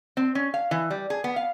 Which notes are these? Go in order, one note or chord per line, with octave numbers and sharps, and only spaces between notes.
C4
C#4
F5
E3
G3
G#4
B3
F5